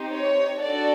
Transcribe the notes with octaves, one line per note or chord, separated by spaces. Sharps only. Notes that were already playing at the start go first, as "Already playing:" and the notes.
Already playing: C4 D#4 G4
C#5
D4 F#4 A4 D5